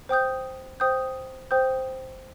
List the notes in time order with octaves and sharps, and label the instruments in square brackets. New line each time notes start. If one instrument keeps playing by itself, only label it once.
[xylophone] C5 G5 D#6 G6
C5 G5 D#6 G6
C5 G5 D#6 G6